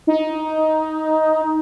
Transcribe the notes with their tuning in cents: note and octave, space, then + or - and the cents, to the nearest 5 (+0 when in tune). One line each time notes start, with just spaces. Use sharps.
D#4 +10